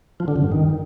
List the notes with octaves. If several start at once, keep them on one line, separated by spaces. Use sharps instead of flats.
F3
D3
C#3
G2
D#3